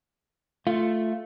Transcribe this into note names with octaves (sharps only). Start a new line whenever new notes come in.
A3 F4